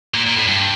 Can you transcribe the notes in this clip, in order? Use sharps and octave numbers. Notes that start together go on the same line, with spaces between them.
A#2
A#2
A2
G2